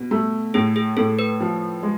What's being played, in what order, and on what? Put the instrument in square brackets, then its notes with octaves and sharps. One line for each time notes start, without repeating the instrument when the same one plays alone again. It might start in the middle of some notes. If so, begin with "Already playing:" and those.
Already playing: [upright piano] B2
A3
[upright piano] A2 [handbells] G#4
[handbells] G#4
[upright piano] A2 [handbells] A4
[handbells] B4
[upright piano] F3
G#3